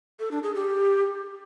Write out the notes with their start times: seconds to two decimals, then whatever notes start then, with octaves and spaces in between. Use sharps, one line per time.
0.20 A4
0.31 D4
0.43 G#4
0.55 G4